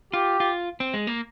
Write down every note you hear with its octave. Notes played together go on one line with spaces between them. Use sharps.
F4 G4
F4
C4
G#3
A#3